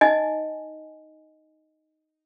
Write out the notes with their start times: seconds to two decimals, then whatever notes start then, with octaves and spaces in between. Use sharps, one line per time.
0.01 D#4 D#5 G#5